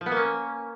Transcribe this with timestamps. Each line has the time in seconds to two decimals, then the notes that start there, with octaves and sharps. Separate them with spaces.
0.01 F3
0.06 B3
0.11 A#3
0.17 C#4